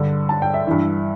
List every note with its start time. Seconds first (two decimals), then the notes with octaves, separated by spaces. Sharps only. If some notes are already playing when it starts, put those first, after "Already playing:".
Already playing: G2 D3
0.29 A5
0.42 G5
0.54 E5
0.67 G2 E3